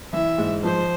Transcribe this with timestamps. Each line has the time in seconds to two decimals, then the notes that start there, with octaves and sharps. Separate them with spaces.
0.13 E3 E5
0.38 G#2
0.63 F3 C5